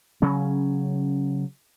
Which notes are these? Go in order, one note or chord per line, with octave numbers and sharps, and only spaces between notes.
C#3 F#3 C#4